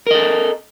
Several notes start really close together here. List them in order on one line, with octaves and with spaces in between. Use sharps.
A#4 D#5 A4